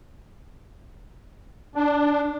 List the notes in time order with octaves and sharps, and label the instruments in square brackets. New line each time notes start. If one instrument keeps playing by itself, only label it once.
[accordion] D4